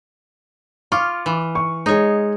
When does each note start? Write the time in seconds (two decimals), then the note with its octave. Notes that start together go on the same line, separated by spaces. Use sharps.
0.92 F4 C#6 D6 F6
1.26 E3
1.55 C#6
1.86 G#3 D#4 G#4 C#5